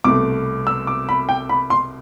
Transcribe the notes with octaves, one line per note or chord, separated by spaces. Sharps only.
C2 B2 A3 D6
E6
D6
B5
G5
B5
C6